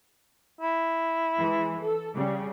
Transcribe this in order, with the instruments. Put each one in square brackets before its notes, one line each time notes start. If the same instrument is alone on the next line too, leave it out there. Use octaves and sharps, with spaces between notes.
[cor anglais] E4
[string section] E3 G#3
A4
C#3 G3